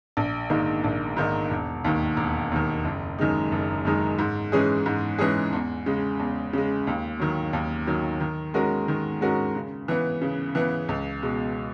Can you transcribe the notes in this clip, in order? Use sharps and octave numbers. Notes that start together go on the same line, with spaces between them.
A#1
G#2 D#3 A#3 D#4
A#1
G#2 D#3 A#3 D#4
E1
D#2 D#3
E1
D#2 D#3
F#1
F#2 D#3 G#3 D#4
F#1
F#2 D#3 G#3 D#4
G#2
E3 G#3 C#4 G#4
G#2
E3 G#3 C#4 G#4
E2
C#3 G#3
E2
C#3 G#3
D#2
D#3 F#3
D#2
D#3 F#3
D#3
G#3 C#4 F#4 A#4
D#3
G#3 C#4 F#4 A#4
C#3
E3 B3
C#3
E3 B3
C#2
B2 G#3